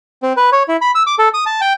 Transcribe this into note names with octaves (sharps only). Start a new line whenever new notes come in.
C4
B4
C#5
E4
B5
E6
D6
A4
D#6
A5
G5